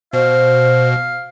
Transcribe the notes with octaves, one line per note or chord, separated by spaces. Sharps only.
B2 C5 F5